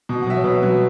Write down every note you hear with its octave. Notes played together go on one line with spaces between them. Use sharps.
B2
F#5
F#3 E5
C#5
B2 B4
F#3